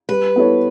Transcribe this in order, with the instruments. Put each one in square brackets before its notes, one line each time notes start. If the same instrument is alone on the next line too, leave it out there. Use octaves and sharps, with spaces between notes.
[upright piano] G3 [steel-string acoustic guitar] B4
[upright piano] B3 E4 A4 C#5